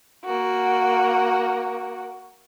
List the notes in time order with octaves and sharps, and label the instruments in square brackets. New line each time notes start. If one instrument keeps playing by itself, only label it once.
[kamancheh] A#3 F#4